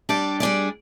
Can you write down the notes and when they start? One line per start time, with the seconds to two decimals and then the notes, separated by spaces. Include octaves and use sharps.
0.09 G3 D4 G4 D5
0.40 G3 D4 G#4 D5